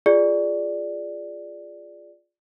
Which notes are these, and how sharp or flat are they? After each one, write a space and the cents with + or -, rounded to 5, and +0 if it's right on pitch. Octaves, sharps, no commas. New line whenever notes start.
F4 +0 G#4 +0 D5 +0